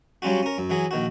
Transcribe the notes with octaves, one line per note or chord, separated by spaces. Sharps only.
F#3 G3 C#4 F4 F#4
C#4 A#4
F#2
E3 F#3 G#4
A#1 D#3 F#4